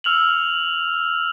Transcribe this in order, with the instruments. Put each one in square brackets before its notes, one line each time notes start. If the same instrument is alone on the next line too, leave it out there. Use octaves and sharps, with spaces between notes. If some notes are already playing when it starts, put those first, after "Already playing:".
[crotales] E6 F6 F7 F#7